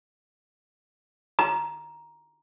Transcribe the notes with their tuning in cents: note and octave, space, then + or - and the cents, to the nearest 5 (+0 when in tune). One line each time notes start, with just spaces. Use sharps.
A#5 +10